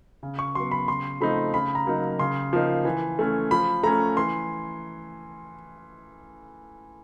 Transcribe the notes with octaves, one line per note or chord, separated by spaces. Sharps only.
C#3
C#6
F#3 B3 C6
B5
C#3 C6
F3 A3 C4 D#4 B5
C#3 B5
A#5
F#3 A#3 D#4
C#3 C6
F3 A#3 D#4
E3
A3 C#4
F3 B5
A3 C#4 A#5
E3 C6